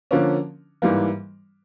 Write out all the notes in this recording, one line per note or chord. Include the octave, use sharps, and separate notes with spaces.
D3 F3 A#3 C#4
G#2 E3 G3 A#3